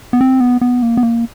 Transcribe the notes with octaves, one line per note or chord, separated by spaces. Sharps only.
B3
C4
B3
B3
A#3
B3
A#3